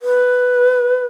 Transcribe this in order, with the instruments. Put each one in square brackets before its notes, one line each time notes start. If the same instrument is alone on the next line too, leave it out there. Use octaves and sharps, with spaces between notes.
[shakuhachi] B4